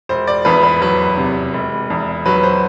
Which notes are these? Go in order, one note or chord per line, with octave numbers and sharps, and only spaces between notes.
E1 C5
D5
E2 B4
B4
F#3 B4
C3
E1
E2
F#3 B4
C5